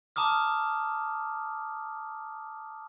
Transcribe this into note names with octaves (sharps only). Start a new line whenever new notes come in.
A5 A#5 D6 D#6 F6